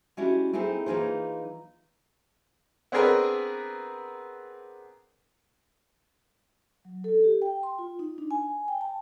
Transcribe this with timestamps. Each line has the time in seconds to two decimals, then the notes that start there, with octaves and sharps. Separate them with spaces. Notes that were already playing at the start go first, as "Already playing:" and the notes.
0.17 G#3 C#4 D4 E4 F#4 G4
0.53 C4 D#4 E4 G#4 A4 C5
0.86 E3 A#3 D#4 F4 G#4 C5
2.92 B3 C4 D4 G#4 A#4 B4
6.85 F#3
7.04 A4
7.24 G4
7.42 G5
7.63 C6
7.78 F4
7.99 D#4
8.18 D4
8.31 G#5
8.68 G5
8.81 A5